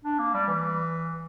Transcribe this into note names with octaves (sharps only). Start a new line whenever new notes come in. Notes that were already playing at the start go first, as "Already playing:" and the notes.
D4
A#3
G3
E3